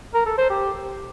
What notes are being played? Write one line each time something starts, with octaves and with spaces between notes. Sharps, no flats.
A#4
A4
C5
G4